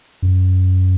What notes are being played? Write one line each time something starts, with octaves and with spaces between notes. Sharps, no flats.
F#2